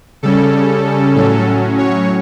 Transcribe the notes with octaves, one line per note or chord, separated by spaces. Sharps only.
C#3 G3 C#4 A4
A2 F#3 C#4 A4
C#5